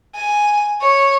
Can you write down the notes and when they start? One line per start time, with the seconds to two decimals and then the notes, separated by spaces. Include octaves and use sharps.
0.15 G#5
0.81 C#5